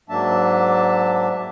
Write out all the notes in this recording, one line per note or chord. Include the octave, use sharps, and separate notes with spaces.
G#2 F#3 A#3 D4 E5 A5